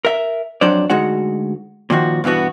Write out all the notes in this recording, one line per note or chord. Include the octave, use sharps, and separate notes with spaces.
A#4 E5
F2 F#3 D4 C5 D5
D2 G#3 D#4 F#4 F#5
A#2 D#3 F3 F#4
G2 B2 E3 B3 F#4